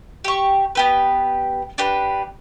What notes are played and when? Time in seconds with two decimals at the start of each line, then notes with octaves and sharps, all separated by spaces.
0.24 G4 C#6
0.75 B3 G4 B4
1.78 D4 G4 B4